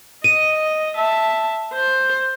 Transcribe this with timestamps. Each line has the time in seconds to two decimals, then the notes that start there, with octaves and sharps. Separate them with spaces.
0.24 D#5 D#7
0.97 E5 A5
1.74 C5